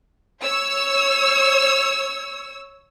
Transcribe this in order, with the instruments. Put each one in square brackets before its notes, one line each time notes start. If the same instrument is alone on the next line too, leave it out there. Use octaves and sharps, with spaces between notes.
[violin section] C#5 E6